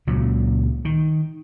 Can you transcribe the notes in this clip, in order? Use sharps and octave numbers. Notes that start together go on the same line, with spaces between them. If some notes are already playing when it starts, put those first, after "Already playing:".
C#2 A#2 C#3 F#3
D#3